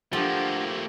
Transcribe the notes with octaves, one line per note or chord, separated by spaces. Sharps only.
F3 A3 A#3 D4 G4 A4 F#5